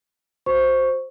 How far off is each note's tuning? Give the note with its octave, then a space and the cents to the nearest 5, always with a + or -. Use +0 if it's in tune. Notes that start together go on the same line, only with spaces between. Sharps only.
F#4 -5 C5 +0 C#6 +0